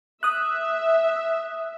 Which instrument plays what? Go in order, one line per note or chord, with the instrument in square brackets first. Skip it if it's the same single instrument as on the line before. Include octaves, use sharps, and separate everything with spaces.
[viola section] E5 [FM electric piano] D#6 F#6